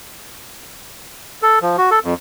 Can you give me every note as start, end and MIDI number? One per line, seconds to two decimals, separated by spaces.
1.42 1.59 69
1.62 1.76 53
1.78 1.90 66
1.91 1.99 69
2.04 2.14 41